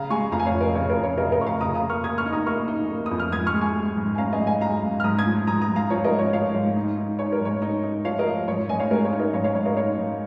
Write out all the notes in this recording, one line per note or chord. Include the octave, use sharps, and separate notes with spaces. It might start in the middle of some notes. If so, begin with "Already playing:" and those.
Already playing: C#3 F5 A#5
G#3 G#5 C#6
F2 F5 A#5
G#5
C#5 F5
F2
A#4 D#5
C#3 C#5
A#4
F2
C#5
C#3 A#4 D#5
A#4 D#5
F2 C#6
F5 A#5
C#3 A#5 D#6
A#5 D#6
A#3
C#6 F6
A#3 D#6 G#6
C#6 F6
D#4
A#5 D#6
A#3 C#6 F6
D#4
A#3
D#6
F2
F6
G#2 D#6 G#6
C#6 F6
G#3
G#5 C#6
G#3
G#2
G#5
C#4 F5 A#5
D#5 G#5
G#2
D#5 G#5
G#3 F5 A#5
G#2
F6
G#2 A#5 D#6
D#6 G#6
F3
G#2 A#5 D#6
A#5 D#6
G#2
F5 A#5
F3 C#5 F5
A#4 D#5
G#2
C#5
F3 C#5 F5
G#2
D#4
D#4
D#4 C#5
A#4
G#2 C#5
D#4
D#4
F3 C#5 F5
A#4 D#5
F3
G#2 C#5
G#2 D#5 G#5
C#5 F5
G#3 A#4
C#5
D#4
A#4 D#5
G#2 C#5 F5
C#5 F5
G#2 C#5
A#4 D#5
D#4 C#5 F5
G#2